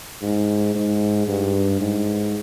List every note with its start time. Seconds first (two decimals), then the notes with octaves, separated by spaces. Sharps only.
0.22 G#2
0.75 G#2
1.28 G2
1.80 G#2